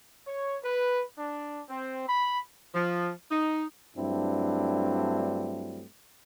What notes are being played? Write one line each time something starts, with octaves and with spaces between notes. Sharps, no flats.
C#5
B4
D4
C4
B5
F3
D#4
G2 F#3 A3 C4 D4 E4